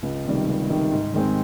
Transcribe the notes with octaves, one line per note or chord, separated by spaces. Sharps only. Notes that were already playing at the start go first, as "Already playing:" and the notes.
C#2
C3 D#3 G3
C#2
C3 D#3 G3
G#2
D#3 G#3 C4